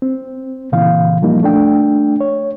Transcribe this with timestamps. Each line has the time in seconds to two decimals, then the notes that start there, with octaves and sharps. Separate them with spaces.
0.02 C4
0.72 A#2 C#3 E3 F5
1.22 F3 G3 A#3 D#4
1.43 A3 D4 G5
2.21 C#5